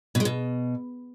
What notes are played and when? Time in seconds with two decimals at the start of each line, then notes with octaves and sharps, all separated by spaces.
0.15 B2
0.20 G#3
0.25 B2